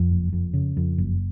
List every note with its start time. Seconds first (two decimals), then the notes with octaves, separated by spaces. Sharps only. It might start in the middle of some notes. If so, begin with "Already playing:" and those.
Already playing: F2
0.10 F#1
0.33 F2
0.54 C#3
0.77 F2
0.98 F#1